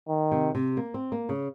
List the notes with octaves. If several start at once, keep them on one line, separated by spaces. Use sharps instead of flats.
D#3
C3
C3
A#3
C4
A#3
C#3